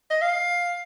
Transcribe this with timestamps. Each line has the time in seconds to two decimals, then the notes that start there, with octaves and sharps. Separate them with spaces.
0.11 D#5
0.22 F5